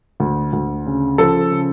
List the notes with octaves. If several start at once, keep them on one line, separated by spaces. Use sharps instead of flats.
D2
D2
C#3
F3 A4
C#3